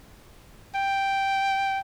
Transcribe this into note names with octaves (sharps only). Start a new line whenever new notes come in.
G5